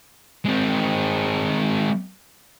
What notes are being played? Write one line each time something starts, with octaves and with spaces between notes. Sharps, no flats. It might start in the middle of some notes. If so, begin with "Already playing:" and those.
G#3 C4